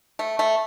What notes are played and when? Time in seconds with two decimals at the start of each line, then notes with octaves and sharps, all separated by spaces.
0.19 A3
0.39 A3